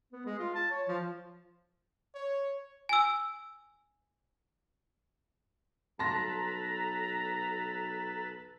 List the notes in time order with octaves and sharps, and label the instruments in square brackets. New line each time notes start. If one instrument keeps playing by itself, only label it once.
[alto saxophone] B3
G#3
F4
A5
C#5
F3
[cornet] C#5
[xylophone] G#5 E6
[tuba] B1 [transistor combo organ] A4 B4 [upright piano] A5 C6 A#6 [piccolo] A#5